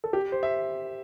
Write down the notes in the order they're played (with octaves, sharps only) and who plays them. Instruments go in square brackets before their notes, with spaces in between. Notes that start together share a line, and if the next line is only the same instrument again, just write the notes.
[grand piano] A4
G4
C5
E5